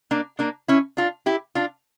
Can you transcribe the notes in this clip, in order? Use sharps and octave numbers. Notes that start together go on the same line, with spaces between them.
A#3 D4
A#3 D4
C#4 E4
D4 F4
E4 G4
D4 F4